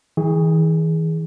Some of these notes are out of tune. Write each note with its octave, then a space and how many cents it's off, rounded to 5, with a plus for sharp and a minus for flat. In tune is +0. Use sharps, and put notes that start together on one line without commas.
E3 -45 G#4 +0